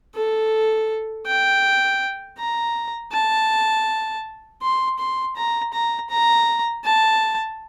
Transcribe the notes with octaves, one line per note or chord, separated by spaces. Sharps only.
A4
G5
A#5
A5
C6
C6
A#5
A#5
A#5
A5